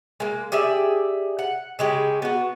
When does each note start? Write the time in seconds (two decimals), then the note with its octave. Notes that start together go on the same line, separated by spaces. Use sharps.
0.20 G#3 A#3
0.52 G4 G#4 D5 E5
1.39 F#5
1.79 C#3 G#3 G4
2.22 B3 F#4